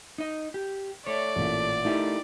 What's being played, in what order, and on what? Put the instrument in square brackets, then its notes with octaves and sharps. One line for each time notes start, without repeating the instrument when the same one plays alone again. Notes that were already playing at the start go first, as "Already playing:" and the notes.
[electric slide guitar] D#4 D#5
G4
[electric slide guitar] A3 C#5 [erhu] D5
[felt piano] A1 A#2
[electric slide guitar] A3 G4 A#4 [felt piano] D#4 E4